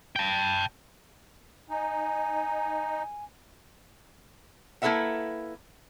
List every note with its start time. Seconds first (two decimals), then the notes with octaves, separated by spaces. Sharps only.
0.16 G5 A5
1.70 D#4 G#5
4.82 A#3 E4 A4 B4 E5 F#5